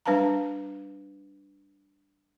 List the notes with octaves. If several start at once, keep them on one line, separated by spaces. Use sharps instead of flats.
G3 D4 B4 F5 A5 A#5